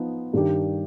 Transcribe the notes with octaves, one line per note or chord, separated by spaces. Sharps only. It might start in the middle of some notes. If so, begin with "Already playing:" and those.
Already playing: F3 B3 D#4
G2 D#3 G3 D4 G4